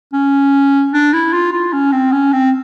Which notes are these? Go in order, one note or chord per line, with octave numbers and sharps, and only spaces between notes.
C#4
D4
E4
F4
F4
C#4
C4
C#4
C4